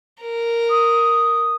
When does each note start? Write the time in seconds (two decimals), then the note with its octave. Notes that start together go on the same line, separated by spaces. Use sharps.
0.22 A#4
0.70 D#6